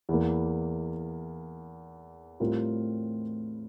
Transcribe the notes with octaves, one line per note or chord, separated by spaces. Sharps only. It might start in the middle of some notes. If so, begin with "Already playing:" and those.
E2 E3 A#3
A2 G3 C4 F4 A#4